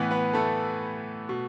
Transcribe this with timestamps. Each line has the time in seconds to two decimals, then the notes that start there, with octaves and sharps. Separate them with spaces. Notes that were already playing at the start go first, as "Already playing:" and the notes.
Already playing: A2 E3 B3 B4
0.11 B3 B4
0.33 A3 A4
1.29 B2